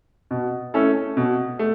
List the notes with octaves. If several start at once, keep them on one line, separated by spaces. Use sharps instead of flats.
B2
A3 C#4 E4 A4
B2
A3